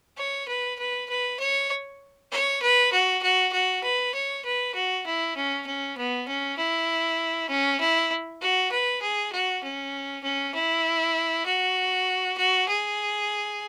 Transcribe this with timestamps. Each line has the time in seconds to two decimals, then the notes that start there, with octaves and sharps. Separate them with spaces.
0.18 C#5
0.48 B4
0.79 B4
1.09 B4
1.40 C#5
2.32 C#5
2.62 B4
2.92 F#4
3.23 F#4
3.53 F#4
3.83 B4
4.14 C#5
4.45 B4
4.75 F#4
5.06 E4
5.36 C#4
5.66 C#4
5.97 B3
6.28 C#4
6.58 E4
7.49 C#4
7.80 E4
8.42 F#4
8.72 B4
9.02 G#4
9.32 F#4
9.63 C#4
10.24 C#4
10.54 E4
11.46 F#4
12.38 F#4
12.68 G#4